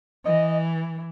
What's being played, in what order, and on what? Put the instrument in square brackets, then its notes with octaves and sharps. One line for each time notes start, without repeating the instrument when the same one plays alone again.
[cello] E3 [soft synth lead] D#5